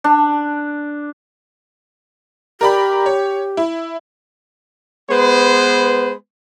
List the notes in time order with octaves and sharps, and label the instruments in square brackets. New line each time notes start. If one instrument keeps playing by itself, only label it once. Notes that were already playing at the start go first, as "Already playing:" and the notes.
[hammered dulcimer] D4
[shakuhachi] G4 [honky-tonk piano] A#4 D5 B5
[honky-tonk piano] C#5
E4
[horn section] G#3 B3 B4 C5